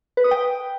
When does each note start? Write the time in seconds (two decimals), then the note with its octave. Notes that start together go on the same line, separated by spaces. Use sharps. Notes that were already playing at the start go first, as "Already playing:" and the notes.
0.17 B4
0.24 D#6
0.31 G5